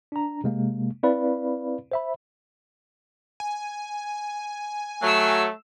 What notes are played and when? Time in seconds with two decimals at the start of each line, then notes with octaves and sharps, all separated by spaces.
0.12 D4 A#5
0.44 C3 G#3 A#3
1.03 C4 E4 B4 D5 F5 B5
1.92 C5 E5 B5
3.40 G#5
5.02 F#3 A3 E6 C7